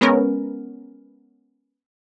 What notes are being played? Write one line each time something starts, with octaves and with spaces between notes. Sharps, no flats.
G#3 B3 C#4 A#4